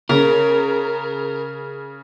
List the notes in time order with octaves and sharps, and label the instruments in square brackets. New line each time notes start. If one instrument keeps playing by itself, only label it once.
[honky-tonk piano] C#3 [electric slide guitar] A#4